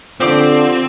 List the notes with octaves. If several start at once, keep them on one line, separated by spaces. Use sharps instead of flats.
D3 F3 C4 G4 D5 D6